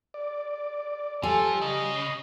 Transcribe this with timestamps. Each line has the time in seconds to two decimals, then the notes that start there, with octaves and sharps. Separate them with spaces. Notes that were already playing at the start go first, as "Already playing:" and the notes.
0.14 D5
1.23 F3 G3 A4 G#5
1.61 C#3 D#5